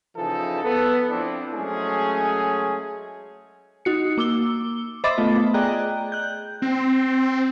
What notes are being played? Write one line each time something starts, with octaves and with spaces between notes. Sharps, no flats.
C#3 E3 F3 D#4 E4 A4
B3 A4
F3 C4 D4 E4
F#3 G#3 A3 C#4 G#4
D#4 F#4 C#7
A#3 D6 E6 G7
C5 D#5 E5 B5 D6 A6
A3 B3 F4
G#4 D5 D#5 G5 A#5 F#6
F#6 G6
C4